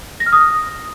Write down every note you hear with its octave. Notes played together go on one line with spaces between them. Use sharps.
A#6
F6
D#6